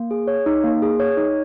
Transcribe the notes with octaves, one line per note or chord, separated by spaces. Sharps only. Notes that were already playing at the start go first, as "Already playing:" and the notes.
Already playing: A#3
G#4
C#5
D#4
A#3
G#4
C#5
D#4